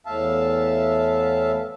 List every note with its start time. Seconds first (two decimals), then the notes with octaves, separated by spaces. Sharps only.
0.06 E2 A2 E5 F5 A5